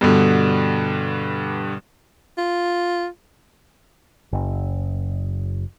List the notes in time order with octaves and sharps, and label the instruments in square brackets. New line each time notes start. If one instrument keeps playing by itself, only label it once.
[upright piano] G2 B2 D3
[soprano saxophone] F4
[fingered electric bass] F#1